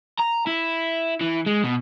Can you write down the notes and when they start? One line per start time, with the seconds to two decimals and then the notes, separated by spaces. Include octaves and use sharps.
0.20 A#5
0.47 E4
1.21 E3
1.46 G#3
1.64 B2